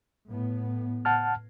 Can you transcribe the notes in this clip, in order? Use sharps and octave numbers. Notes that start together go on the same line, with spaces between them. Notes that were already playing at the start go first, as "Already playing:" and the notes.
A2 B3
F#5 A5 F6